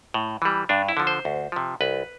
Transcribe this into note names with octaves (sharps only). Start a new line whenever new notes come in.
A2
E3 G3
G2 D4
E4
D3 F3
C5
D2
C3 F3
C2 B4